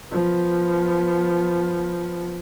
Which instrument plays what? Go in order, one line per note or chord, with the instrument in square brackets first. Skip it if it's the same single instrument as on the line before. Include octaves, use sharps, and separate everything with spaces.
[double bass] F3 B3